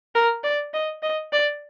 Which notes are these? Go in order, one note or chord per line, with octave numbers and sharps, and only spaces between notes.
A#4
D5
D#5
D#5
D5